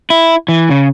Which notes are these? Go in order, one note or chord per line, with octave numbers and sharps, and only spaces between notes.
E4
E3
C#3